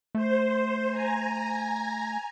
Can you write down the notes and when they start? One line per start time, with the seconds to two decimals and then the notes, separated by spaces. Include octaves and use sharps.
0.15 A3 C5
0.91 G#5 A#5